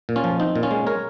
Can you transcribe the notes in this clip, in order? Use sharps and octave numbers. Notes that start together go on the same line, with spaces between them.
A#2
C#4 F4
F3
C4 D#4
A#2
C#4 F4
G#3
A#4 C#5